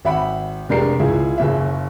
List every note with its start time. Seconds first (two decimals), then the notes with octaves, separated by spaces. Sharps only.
0.05 G#1 E5 F#5 B5
0.69 F1 G#3 D4 G4 A#4 C7
0.99 C#2 G#3 E4 G#4
1.38 F#1 C#3 E5